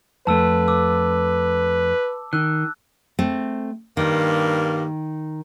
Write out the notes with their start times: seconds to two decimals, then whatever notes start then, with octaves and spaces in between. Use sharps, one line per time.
0.27 F2 A3 B4 A5 E6
0.68 D6 E6
2.33 D#3 E6 F#6
3.19 A3 C4
3.97 G2 D#3 A#3